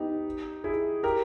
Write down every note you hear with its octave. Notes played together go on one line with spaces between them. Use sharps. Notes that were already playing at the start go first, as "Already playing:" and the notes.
Already playing: B3 D#4 G4
E4 G#4
G4 A#4